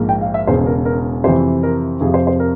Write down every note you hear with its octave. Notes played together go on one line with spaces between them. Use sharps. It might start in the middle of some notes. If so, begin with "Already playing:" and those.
Already playing: A#1 G#2 F3 A#3
G5
F5
E5
E1 E2 C#3 C5
A#4
A#4
F2 C3 E3 C5
A#4
F2 C3 F3 G#4
C5
C5
A#4